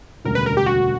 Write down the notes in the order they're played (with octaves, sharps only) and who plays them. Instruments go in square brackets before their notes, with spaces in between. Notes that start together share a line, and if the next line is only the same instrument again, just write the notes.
[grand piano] E1 D2 C#3 G3 [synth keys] A#4
[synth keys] B4
A#4
G4
F#4